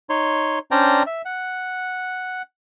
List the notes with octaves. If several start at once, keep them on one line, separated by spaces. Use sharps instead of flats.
D#4 C#5 C6
C#4 D4 C5 D5 G5 A#5
E5
F#5